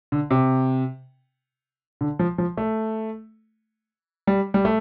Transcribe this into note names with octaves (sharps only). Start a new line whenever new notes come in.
D3
C3
D3
F3
F3
A3
G3
G3
A3